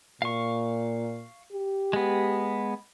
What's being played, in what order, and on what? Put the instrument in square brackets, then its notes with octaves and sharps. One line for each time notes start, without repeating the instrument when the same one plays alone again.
[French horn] A#2 [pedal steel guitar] F5 C#6
[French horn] G4
[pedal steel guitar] G#3 B3